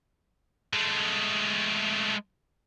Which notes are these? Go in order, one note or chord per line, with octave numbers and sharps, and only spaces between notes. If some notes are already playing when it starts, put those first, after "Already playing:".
G#3 A3